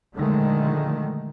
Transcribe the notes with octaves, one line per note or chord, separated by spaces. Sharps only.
A#2 D3 D#3 F3 G#3 A3